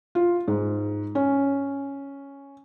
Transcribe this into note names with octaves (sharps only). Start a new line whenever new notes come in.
F4
G#2
C#4